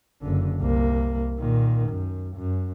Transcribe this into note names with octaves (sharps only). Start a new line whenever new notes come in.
F#1 D3
C2 A#3
A#2 D#3
F#2
F#2